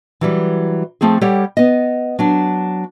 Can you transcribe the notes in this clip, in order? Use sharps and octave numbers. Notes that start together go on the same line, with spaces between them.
E3 F#3 G3
F3 A3 C4 G#4
G3 G4 A4 C#5 F#5
B3 D#5
F#3 D4